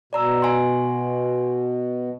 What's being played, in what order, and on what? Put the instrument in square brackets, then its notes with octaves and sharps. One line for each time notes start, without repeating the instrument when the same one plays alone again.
[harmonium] B2 [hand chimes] D5 A#5 E6
[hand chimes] G#5 C6